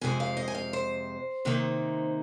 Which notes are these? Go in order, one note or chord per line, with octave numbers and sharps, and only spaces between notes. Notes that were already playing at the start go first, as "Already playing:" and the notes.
F2 C3 G#3 C4 G#5
F5
D#5
G#5
F5
C5
C3 D#3 A#3 D#4